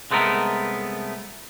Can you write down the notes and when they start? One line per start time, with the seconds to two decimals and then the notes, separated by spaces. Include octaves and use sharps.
0.11 C2 G#3 A3 B3 A#4